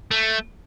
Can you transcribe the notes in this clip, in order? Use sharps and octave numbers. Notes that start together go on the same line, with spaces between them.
A3